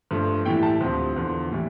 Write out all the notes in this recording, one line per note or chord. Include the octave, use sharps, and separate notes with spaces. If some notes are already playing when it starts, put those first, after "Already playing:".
G2 F3 A3
A2 E3 G3 G5
A5
D2 C3 F3
E2 D3 F3
A2 E3 G3